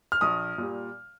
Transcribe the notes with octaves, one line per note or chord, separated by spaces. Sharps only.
F6
A#1 D#6
A#2 G3